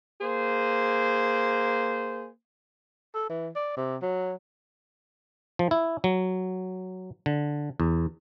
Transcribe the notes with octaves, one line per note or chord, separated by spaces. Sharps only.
A#3 G#4 C5
A4
E3
D5
C3
F#3
F3
E4
F#3
D3
E2